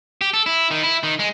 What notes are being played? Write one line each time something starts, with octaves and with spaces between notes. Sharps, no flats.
G4
A4
E4
D#3
E4
D#3
G#3